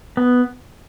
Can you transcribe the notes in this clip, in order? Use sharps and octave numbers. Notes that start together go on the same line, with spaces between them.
B3